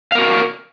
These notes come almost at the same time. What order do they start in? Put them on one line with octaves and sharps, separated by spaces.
F5 A#4 F#4